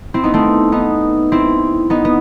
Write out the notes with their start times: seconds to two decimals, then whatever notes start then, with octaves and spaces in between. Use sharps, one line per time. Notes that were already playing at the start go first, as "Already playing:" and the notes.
0.14 C4 E4
0.23 B3 D#4
0.34 A3 C4
0.72 B3 D#4
1.32 C4 E4
1.90 B3 D#4
2.05 B3